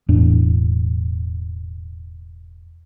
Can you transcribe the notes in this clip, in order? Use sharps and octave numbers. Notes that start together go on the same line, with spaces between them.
E1 E2 A2 D4